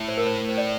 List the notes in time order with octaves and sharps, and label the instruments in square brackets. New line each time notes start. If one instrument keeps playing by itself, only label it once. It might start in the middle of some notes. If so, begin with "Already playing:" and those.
Already playing: [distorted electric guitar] A2
[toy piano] C5
A#4
C5
C5
D5